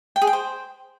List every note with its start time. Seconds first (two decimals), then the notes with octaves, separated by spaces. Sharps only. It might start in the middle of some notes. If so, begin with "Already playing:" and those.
0.16 G5
0.22 G#4
0.27 G5
0.33 C5